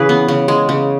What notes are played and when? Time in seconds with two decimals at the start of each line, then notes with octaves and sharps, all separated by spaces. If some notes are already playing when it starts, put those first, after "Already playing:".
Already playing: C#3 E3 G#4 B4
0.09 B3
0.28 C#3
0.48 G#3
0.69 C#3